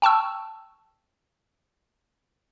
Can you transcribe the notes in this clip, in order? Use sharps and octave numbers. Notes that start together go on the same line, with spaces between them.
G5 A5 C#6 E6